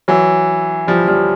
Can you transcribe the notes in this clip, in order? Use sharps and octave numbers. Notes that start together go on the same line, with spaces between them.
E3 F#3
F3 G3
F3 G3